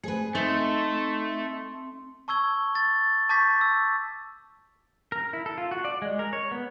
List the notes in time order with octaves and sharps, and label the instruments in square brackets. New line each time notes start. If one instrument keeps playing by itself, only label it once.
[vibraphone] A3 C5 G#5 [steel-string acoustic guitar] G#4 B4
[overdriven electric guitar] A3 [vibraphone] C4 E5 C6 [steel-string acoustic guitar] D#4
[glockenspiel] A5 C#6 E6 G#6 G7
A6
A5 C#6 D6 G6 A6 B6
E6
[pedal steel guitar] A#4
E4
A4
F4
F#4
D5
G#3
A#4
C#5
B3